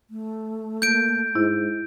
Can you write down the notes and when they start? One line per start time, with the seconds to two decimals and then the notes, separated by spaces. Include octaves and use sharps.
0.10 A3
0.82 A#3 G6 D7
1.35 G#2 E4